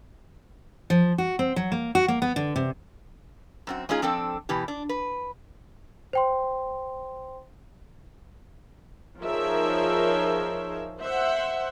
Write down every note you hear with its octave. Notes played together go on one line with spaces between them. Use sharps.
F3
F#4
C4
F#3
A#3
F#4
A#3
B3
D3
C3
F#2 C4 F#4
G#3 C#4 D#4 F4 G#4
F3 C4 D4 A4 G5
B2 E3 G4
D4
B4
C5 G5 C6
F3 D#4 G#4 A#4 C#5 E5
C5 E5 F#5